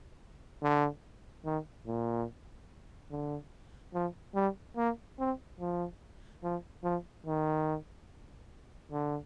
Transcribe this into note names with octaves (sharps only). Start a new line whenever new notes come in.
D3
D#3
A#2
D3
F3
G3
A#3
C4
F3
F3
F3
D#3
D3